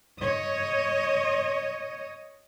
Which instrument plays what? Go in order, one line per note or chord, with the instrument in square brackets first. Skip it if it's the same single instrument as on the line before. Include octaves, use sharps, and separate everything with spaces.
[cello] C#5 D#5